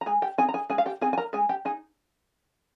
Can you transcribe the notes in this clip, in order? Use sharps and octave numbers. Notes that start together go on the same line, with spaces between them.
A#5
G#3 G#4 G#5
G4 G5
C4 D#4 G#4 G#5
A#5
G#4 G#5
G#3 G#4 G#5
F5
G4 G5
C4 D#4 G#4 G#5
G#5
A#4 A#5
G#3 G#4 G#5
G4 G5
D#4 G#4 G#5